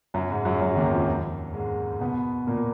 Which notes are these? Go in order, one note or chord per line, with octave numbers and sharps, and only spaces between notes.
F#2 F#3
G#2 G#3
F#2 F#3
F#2 F#3
D#2 D#3
F2 F3
G#2 G#3
B2 B3
A#2 A#3